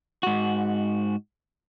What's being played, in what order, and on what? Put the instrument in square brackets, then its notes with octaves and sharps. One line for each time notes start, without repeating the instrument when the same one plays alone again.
[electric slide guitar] G#2 F#4